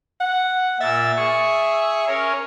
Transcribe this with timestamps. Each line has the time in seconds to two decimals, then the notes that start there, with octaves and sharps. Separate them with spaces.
0.20 F#5
0.80 A#2 E5 E6 A6
1.17 G#4 C#6
2.08 C#4 A#4 C#5